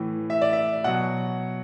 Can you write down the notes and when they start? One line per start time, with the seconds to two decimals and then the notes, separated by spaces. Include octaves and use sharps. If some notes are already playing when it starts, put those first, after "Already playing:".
Already playing: A2 E3
0.30 E5
0.41 D5
0.53 E5
0.84 B2 F#3 F#5